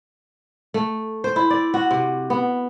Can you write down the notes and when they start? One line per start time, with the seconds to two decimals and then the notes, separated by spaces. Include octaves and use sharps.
0.74 A3
1.24 C5
1.36 E4
1.50 D5
1.74 F#4
1.91 C3
2.30 B3